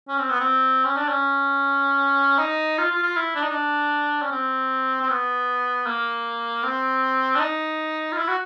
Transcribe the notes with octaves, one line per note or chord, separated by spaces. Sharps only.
C#4
C4
B3
C4
C#4
D4
C#4
D#4
F4
F4
F4
E4
D4
D#4
D4
C#4
C4
C4
B3
A#3
C4
D4
D#4
F4
E4
F#4